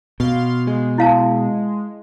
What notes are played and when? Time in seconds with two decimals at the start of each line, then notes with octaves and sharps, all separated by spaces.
0.20 B2 F5 C6
0.67 G#3
0.98 E4 F5 A5